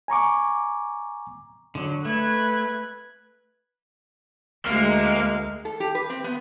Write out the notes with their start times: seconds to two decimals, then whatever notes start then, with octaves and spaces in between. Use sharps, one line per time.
0.08 G#5 A#5 C#6 D6
1.75 D3 F#3
2.05 A3 B4 F#6 G#6
4.66 D2 G#3 A#3
5.65 A4
5.80 G4
5.95 B4
6.10 C4
6.24 B3